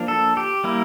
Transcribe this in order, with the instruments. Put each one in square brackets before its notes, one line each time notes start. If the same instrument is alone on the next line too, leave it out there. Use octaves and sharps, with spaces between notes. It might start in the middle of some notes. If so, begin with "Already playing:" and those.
Already playing: [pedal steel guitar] F3 A#3 D4
A4
G4
G3 A#3 E4